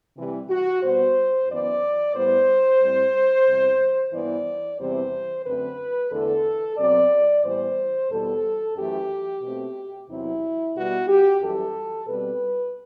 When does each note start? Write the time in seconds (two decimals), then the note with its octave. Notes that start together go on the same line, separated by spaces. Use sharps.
0.16 C3 E3 G3
0.49 F#4
0.81 B2 G3 B3 C5
1.48 F#2 E3 B3 D5
2.14 A2 G3 B3 C5
2.81 A2 G3 C4
3.46 E2 C3 G3
4.13 G2 E3 B3 D5
4.78 E2 C3 E3 G3 C4 C5
5.45 F#2 D3 A3 C4 B4
6.11 E2 D3 A3 A4
6.77 B2 F#3 C4 D5
7.43 A2 E3 G3 B3 C5
8.10 E2 B2 G3 A4
8.75 F#2 E3 A3 G4
9.42 B2 A3 C4
10.08 E2 C3 F#3 C4 E4
10.75 B2 G3 B3 F#4
11.07 G4
11.40 F#2 E3 G3 A4
12.06 B2 G3 C4 B4